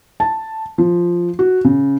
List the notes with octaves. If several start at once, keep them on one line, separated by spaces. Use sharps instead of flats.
A5
F3
F#4
C#3